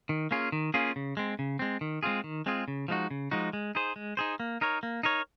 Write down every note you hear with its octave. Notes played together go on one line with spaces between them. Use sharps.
D#3
A#3 C#4 F4 G#4
D#3
A#3 C#4 F4 G#4
C#3
G#3 C4
C#3
G#3 C4
D#3
G#3 C4 F4 G#4
D#3
G#3 C4 F4 G#4
C#3
F3 G#3 D#4 F#4
C#3
F3 G#3 D#4 F#4
G#3
D#4 G#4 C5
G#3
D#4 G#4 C5
A#3
D#4 A#4 C#5
A#3
D#4 A#4 C#5